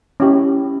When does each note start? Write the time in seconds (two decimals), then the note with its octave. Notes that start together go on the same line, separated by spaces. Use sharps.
0.20 C#4 E4 G4